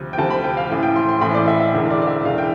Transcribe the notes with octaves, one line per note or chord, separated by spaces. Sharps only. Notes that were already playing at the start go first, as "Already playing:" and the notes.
Already playing: D2 C3 F3
G5
D2 C3 F3 A5
B5
G5
F5
A1 A2 E3
G5
C6
C6
A1 A2 E3 B5
D5
E5
E5
E1 E2 D3
D5
D5
E5
E1 E2 D3 F5
G5